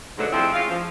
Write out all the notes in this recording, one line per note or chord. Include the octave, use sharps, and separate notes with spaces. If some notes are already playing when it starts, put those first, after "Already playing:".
G#2 B2 D3 F#3 A3
F3 G3 G#3 C4 E4
G#3 C#4 F4 F5
F3